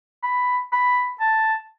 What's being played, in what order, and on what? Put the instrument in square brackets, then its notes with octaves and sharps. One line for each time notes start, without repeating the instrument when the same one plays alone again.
[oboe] B5
B5
A5